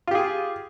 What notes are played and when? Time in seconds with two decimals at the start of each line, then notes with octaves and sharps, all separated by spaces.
0.07 F4
0.11 G4
0.15 G#4